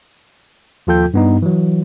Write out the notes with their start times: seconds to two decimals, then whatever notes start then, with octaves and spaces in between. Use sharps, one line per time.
0.87 D#2 F3 F4 A4 G5 G6
1.14 G2 B3 D#4
1.42 E3 F#3